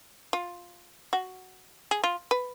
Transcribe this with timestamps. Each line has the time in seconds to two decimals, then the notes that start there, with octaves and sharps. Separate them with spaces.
0.33 F4
1.13 F#4
1.91 G#4
2.04 F4
2.31 B4